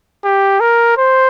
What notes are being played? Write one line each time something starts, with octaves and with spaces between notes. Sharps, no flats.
G4
A#4
C5